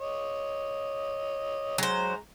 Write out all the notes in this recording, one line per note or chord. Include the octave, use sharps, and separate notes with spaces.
C#5 D#5
F#3 G#3 C5 A#5